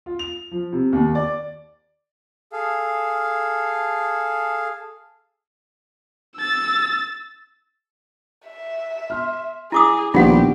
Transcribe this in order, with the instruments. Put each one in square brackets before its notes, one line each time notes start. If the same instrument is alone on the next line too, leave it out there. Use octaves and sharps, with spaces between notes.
[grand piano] F4
F7
F3
C3
D#2
D5
[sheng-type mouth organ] G#4 A4 F5
[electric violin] E6 A6
[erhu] E5
[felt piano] C6 F6
[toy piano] E4 D6 D#6 [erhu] G#4
[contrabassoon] A#1 [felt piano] D#3 G3 B3 [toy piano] F4 G#4 F#5 [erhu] G4